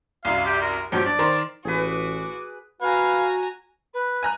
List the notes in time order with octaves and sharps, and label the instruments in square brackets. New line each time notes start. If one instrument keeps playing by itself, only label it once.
[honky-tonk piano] C2 F#2 [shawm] F5
[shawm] G4
A#4
[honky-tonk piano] G2 F3 F#3 [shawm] G4
[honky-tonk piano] D4 [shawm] D5
[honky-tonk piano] D#3 A#4 C5
[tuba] A1 [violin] F#4 D6 [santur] G#4 B4
[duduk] F#4 [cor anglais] B4 [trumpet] F5 [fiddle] G#5 A#5
[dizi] B4
[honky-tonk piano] G#5 A#5 F#6